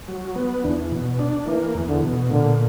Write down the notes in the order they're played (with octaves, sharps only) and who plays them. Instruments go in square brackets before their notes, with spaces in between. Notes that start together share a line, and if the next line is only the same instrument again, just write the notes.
[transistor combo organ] F#3
B3
[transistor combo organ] E2 [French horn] D4
[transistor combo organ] B2
D4
[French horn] E3 [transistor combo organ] A#3
[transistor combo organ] E2
[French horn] D3
[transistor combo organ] B2
[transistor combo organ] A#2 [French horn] D3